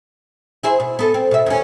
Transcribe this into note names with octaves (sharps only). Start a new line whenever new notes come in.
E4 G#4 C5
B2
B3 A4
C4
B2 E5
D#2 C#4